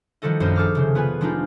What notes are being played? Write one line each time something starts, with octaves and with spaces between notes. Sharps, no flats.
D#3 F3 G3 F#4 A4 D#5
A#1 F#2 C5 D#5
G#4 A4 D6 F6
F1 C#3 C5
B3 F4 B4 G#5
F3 G3 G#3 D4 D#4 F4